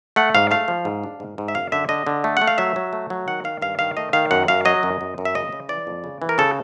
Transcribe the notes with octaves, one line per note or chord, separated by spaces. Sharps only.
A3 F#5
G#2 F5
A3 F5
F3
G#2
D4
G#2
G#2
E5
F#2 F5
D3 E5
D3 D#5
D3
A3
A3 F#5
F5
F#3 E5
F#3
A3
F#3
D#3 F#5
D#3 F5
G2 F5
D#3 F5
A3 D#5
D#3 F5
F#2 F#5
F#2 F5
F#3 D#5
F#2
F#2
F#2
E5
C#3 D#5
C#3
E3 D5
F2
C#3
E3
A#4
C#3 A4